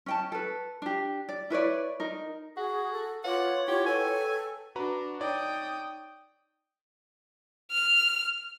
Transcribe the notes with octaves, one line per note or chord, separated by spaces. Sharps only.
C#4 G5 A5
A4 B4
D4 G4
D5
E4 B4 C#5 D5
D#4 A#4
F#4 G#4 F#5
A4
F4 B4 C#5 F5 F#5 D6
E4 F4 G4 F#5 G#6
A4 B4 G5 G#5
D4 F#4 B4 A#5
D#4 C#5 D5 G5 D#6
F6